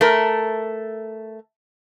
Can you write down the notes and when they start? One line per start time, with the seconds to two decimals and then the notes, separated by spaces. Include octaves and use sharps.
0.01 A3 A#4